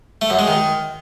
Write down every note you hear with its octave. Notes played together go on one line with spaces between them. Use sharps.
A3
F#2
G#3
D#3